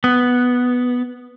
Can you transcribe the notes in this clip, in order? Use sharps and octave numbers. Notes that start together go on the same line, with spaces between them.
B3